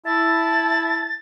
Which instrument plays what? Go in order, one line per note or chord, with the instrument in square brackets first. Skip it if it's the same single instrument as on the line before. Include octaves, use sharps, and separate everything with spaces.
[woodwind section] E4 [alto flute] A5 [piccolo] A6